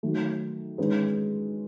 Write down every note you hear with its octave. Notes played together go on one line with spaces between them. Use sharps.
D#3 F#3 A3
D#3 G#3 C#4 G#4 B4